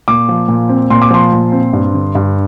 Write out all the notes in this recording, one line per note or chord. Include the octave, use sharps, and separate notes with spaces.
A#2 D6
F3
A#2
C4
A#2 C6
D6
F3 C6
A#2
C4
G2
D3
G2